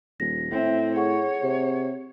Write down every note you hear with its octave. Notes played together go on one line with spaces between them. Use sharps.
D#1 A#6
A2 C4 E5
G#4 C#5 F#5 C#6
C3